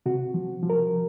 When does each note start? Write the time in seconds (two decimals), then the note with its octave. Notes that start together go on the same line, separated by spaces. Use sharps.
0.06 C3 F#4
0.34 F3
0.63 F3
0.70 A#4